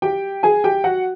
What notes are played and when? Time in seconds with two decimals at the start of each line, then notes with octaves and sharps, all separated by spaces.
0.02 G4 G5
0.43 G#4 G#5
0.64 G4 G5
0.84 F#4 F#5